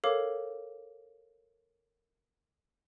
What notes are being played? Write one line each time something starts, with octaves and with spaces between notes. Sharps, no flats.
A4 A#4 C#5 F5 D6